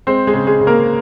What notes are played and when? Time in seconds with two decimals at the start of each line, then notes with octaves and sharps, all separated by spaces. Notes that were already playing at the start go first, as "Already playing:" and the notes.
0.07 G#3 C4 C5
0.27 G#3 G#4
0.34 C#3
0.47 G#3 G#4
0.61 C#3
0.67 A#3 A#4